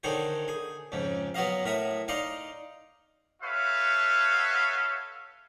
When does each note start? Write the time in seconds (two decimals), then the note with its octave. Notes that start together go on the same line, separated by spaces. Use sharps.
0.03 D3 D#3 D#4 G#4 C5 C#5
0.48 G#4
0.92 F2 G#2 C#3
1.34 F#3 B3 F#4 D#5 F5
1.64 A2 A#4 E5 D#6
2.08 D#4 D5 D#5 F5 C6
3.43 F#4 A4 B4 C#5 E5 F5